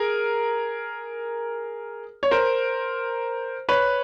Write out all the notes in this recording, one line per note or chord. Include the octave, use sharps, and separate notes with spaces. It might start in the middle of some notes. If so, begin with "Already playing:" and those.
Already playing: G#4 A#4
C#5
A#4 C5
B4 C#5